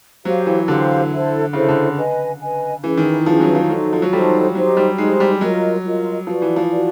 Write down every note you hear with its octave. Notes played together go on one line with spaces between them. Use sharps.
F#3 G4 C5 F5
E3
D3 G4 C5 F5
E4 A4 C5
C#3 E4 A4 C5
D3
B4 D#5 G#5
B4 D#5 G#5
E3 C#4 E4 G#4 B4
D#3
F3 C#4 E4 G#4 B4
F#3
F3
F#3 D#4 F#4 A4 C5
F3
F#3
G3 D#4 F#4 A4 C5
F#3 D#4 G4 C5
G3
G#3 D#4 G4 C5
G3
F#3 F4 A#4 D#5
F4 A#4 D#5
F3 F#4 B4 D5
E3
F3
F#4 B4 D5